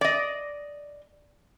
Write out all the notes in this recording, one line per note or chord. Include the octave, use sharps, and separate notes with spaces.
D5 D#5